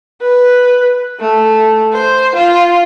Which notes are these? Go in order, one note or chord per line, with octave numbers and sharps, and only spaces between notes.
B4
A3
C5
F4